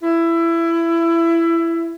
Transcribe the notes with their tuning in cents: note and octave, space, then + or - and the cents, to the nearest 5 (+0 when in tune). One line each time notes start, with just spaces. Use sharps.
E4 +20